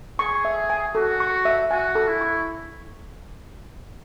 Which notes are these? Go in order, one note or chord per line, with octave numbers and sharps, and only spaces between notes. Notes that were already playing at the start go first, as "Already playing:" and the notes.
G#4 C#6
E5
G#5
F#4 A4
C#6
E5
F#4 G#5
A4
E4
C#6